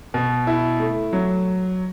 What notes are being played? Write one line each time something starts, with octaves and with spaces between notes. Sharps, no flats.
B2
E4
A3
F#3